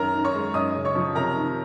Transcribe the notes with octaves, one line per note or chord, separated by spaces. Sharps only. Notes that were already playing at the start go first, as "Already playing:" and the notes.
Already playing: F#2 D#3 A#4 A#5
D#3
C#5 C#6
G#3
F#2 D#5 D#6
C#3
C#5 C#6
F3
C3 A#4 A#5
D#3